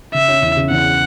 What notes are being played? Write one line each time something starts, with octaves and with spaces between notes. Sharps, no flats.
C#3 E5
C#4
E2
C#3
E2 F#5